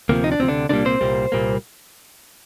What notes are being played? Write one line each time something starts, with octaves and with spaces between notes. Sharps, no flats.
D2 C3 F3 A#3
D#4
D4
D2 C3 F3 C4
D3 D4
C2 A#2 D3 G3 A#3 D4
C4 C5
C2 A#2 G3 A#3
C2 A#2 G3 A#3